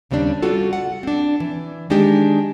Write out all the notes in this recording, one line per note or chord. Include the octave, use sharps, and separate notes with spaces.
D#2 C#3 G3 C4 D4
G3 F4 F#4 A4
F#5
C4 D4
E3
D#3 G#3 D4 D#4 G4